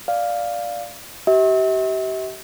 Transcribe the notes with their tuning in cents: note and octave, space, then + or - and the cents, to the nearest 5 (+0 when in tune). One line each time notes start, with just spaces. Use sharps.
D5 +0 F5 +0
G4 -35 E5 -40